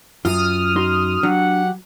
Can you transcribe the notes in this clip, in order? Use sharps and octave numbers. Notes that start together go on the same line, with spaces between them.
F#2 F4 D#6 F6
D#4 F#4 C6
F#3 D4 G4 F#5